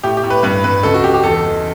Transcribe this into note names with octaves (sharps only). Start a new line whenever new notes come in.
A2 G4
G4
A2
B4
G2 B4
G2 B4
C#2 A4
F#4
C#2 G4
G4
E2 A4
E2